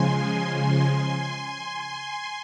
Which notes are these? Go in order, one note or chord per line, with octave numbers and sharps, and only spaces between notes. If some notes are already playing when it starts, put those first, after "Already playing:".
Already playing: C#3 F3 G#3 G#5 C6
G#5 C6